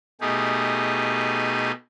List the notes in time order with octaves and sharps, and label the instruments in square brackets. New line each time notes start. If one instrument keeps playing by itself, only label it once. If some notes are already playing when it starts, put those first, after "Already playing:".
[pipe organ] B2 A3 D#4 G4 G#4